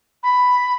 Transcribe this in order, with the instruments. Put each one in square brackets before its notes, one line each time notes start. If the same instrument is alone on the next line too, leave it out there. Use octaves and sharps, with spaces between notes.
[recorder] B5